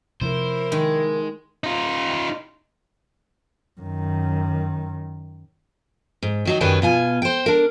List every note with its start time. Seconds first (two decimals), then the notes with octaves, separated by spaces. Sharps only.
0.21 C3 F3 E4 A#4 C5
0.72 D#3 G#3
1.64 D#4 F4
3.81 F#2 D#3
6.23 G#2
6.45 D#3 F#3 D#4
6.60 F#2 D#3 G3 B4 C#5 G#5
6.82 B2 F4 G#5
7.22 C5 G5
7.46 D4 A#4